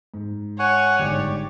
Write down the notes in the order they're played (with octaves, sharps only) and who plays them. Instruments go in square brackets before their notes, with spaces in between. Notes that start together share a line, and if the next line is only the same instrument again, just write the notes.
[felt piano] G#2
[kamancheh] C#5 [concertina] F#5 G#5 C#6
[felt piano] G1 G#2 [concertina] G4 D5